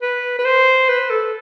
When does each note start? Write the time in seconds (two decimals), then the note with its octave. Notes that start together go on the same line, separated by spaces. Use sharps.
0.02 B4
0.39 B4
0.45 C5
0.89 B4
1.10 A4